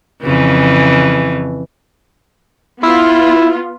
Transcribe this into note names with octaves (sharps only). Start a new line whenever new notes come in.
F2 C#3 E3
B3 E4 F4